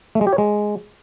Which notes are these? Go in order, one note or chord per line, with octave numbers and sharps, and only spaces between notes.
A3
G#3
G4
C#5
G#3